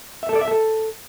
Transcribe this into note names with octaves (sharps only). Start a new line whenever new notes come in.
E5
A4
D5
E5
A4